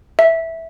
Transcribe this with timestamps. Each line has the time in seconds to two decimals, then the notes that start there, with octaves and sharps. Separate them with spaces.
0.19 E5